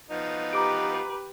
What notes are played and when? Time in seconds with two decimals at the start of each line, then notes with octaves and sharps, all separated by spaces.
0.10 F3 B3 D#4
0.53 G4 B4 A#5 D6 D7